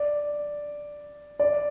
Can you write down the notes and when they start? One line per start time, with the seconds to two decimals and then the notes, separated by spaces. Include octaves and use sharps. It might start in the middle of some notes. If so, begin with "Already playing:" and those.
Already playing: D5
1.39 D5